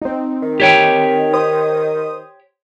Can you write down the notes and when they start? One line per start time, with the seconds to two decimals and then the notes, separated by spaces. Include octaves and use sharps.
0.02 C4 D#4
0.42 D#3
0.60 G4 C#5 G5
1.33 C5 D#6